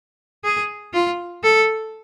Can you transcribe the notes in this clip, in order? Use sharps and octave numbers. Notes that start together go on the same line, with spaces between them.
G#4
F4
A4